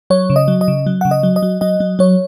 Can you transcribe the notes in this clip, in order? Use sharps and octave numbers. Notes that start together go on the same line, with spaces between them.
F#3 C#5
C#3
D#5
F#3
D#5
C#3
F#3
C#3 F#5
D#5
F#3
D#5
F#3
F#3 D#5
F#3
F#3 C#5